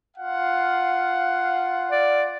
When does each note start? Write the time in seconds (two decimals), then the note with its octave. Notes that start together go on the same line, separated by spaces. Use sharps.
0.17 F4 F5 F#5
1.91 D5